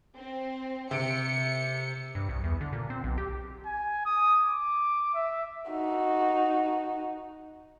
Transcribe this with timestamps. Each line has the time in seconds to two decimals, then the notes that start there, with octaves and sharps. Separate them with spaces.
0.16 C4
0.91 C3 C#7 D7
2.15 G2
2.29 C2
2.44 E2
2.61 D3
2.73 A#2
2.90 C4
3.04 B1
3.18 G4
3.66 G#5
4.05 D#6
4.43 D6
5.15 E5
5.71 D#4 F#4